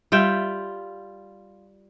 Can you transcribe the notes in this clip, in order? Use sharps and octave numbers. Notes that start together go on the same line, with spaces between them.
G3 F4 E5 G5